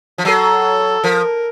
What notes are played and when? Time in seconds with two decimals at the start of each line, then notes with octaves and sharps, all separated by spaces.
0.18 F3
0.25 F#3 A4
1.04 F3 A#4